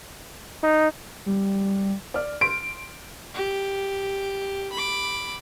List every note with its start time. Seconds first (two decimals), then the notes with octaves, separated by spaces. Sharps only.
0.63 D#4
1.26 G3
2.14 D5 F6
2.41 C6 D7
3.34 G4
4.72 B5 D6